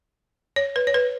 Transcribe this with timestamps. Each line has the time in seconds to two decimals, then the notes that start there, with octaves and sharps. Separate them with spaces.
0.56 C#5
0.76 B4
0.87 C#5
0.94 B4